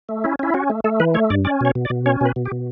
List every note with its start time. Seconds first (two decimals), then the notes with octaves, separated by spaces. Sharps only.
0.09 A3
0.24 C#4 E4
0.39 C#4 E4
0.54 C#4 F#4
0.70 A3
0.84 A3 A4
1.00 E3 B4
1.14 A3 C#5
1.30 G2 D5
1.45 C#4 D5
1.61 B2 C#5
1.75 B2
1.85 D5
1.90 B2
2.06 C#4 C#5
2.21 B2 B4
2.36 B2
2.45 G4
2.52 B2